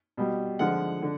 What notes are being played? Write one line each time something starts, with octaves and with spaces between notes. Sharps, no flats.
B2 G3
D3 F3 G#3 F#5
D3